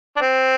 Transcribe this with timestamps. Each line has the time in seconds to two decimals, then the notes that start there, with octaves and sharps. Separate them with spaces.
0.17 D4
0.21 C4